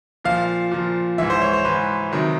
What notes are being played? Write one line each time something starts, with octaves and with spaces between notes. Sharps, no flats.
A#2 F3 F5
A#2 F3
G#2 E3 E5
C5
C#5
C5
G#2 E3 B4
C3 D#3 F#3